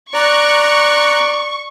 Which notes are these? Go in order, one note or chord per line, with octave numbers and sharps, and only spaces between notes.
D5 A#5 C#6 F#6